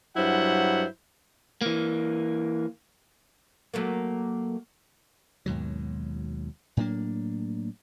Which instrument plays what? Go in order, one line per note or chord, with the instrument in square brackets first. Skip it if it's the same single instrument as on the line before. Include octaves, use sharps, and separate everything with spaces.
[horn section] G2 F#3 E4 C5 F#5
[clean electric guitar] E3 A#3
[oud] F#3 A3 A#3
[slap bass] D#2 G#2 B2 F#3
A2 F#3 A#3 D4